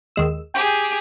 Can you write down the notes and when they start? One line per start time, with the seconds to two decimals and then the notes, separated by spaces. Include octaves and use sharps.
0.16 D#2 G#3 E6
0.54 G4 G#4 G5